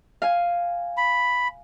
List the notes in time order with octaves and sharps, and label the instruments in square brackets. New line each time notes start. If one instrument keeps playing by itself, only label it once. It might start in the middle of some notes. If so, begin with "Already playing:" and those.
[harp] F5 G#5
[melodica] B5